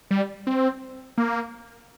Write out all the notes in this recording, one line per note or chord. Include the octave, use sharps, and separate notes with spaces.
G3
C4
A#3